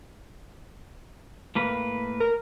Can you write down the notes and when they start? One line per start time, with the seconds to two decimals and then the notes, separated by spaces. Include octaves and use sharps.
1.55 A2 A#3 B4
2.20 A#4